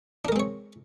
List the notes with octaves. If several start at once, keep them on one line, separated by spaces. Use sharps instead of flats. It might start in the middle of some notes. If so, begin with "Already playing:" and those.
G#3 C4 D4 A#4 C#5